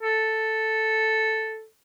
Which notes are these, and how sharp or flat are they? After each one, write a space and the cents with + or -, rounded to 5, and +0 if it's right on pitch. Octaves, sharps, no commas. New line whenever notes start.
A4 +0